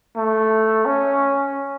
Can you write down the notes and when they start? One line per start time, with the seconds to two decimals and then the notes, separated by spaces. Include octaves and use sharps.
0.16 A3
0.86 C#4